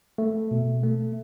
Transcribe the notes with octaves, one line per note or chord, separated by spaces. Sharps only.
A3
B2
A3